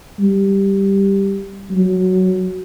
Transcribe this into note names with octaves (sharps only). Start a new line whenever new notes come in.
G3
F#3